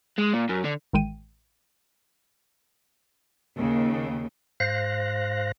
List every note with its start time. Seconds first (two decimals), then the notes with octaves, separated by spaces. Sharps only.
0.18 G#3
0.34 A#2
0.49 F#2
0.65 D3
0.93 A1 D#3 G#3 G5 D#7
3.57 D#2 C#3
4.60 G#2 C5 F5 F#6 A#6